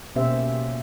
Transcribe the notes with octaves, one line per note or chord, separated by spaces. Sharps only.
B2 A#3 C#4 G4 C5 E5